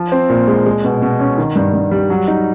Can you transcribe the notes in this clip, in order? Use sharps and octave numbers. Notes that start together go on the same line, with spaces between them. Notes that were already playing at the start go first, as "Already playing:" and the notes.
Already playing: F3
C4
A#2
G#3
G#3
B2
B2
C#4
D#3
G2
G2
G3
F#3
D#4